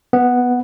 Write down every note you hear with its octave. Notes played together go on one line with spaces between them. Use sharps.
B3